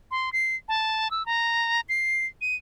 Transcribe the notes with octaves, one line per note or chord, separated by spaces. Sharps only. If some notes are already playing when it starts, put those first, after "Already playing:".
C6
C7
A5
E6
A#5
C7
D#7